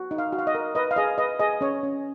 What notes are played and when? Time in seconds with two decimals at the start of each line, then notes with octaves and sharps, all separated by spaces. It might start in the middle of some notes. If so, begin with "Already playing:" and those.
Already playing: F#4
0.11 D#4
0.18 F5
0.32 F#4
0.39 F5
0.47 D#5
0.55 A#4
0.75 B4 D#5
0.91 F5
0.96 G#4 D#5
1.18 B4 D#5
1.39 G#4 D#5
1.61 C#4 C#5
1.83 C#4